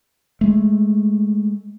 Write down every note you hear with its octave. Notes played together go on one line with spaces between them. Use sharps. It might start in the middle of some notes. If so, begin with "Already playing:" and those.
G#3 A3